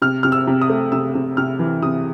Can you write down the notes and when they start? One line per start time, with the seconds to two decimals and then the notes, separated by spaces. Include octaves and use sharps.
0.02 C3 F6
0.23 C3 F6
0.32 E6
0.47 C3
0.61 D#6
0.69 A3
0.92 C3 E6
1.15 C3
1.37 C3 F6
1.59 E3
1.82 C3 D#6